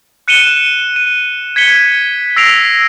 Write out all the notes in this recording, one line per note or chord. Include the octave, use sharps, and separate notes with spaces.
F#6 C#7 D#7 E7 G7
D#7
G#6 B6 C#7 G7
E6 A#6 C7 D7 F7